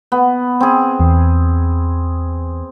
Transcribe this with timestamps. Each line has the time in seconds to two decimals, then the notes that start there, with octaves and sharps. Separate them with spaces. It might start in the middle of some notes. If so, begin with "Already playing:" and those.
0.12 B3
0.60 C4 G#4
1.00 E2